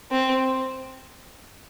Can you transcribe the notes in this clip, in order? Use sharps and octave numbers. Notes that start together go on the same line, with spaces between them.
C4